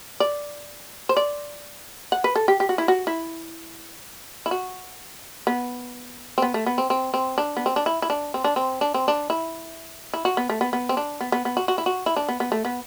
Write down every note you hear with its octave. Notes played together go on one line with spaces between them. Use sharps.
D5
C5
D5
F#5
B4
A4
G4
G4
F#4
E4
F#4
E4
E4
F#4
B3
C4
B3
A3
B3
C4
C4
C4
D4
B3
C4
D4
E4
E4
D4
C4
D4
C4
D4
C4
D4
E4
E4
F#4
B3
A3
B3
B3
C4
D4
B3
B3
B3
F#4
F#4
E4
F#4
E4
D4
B3
B3
A3
B3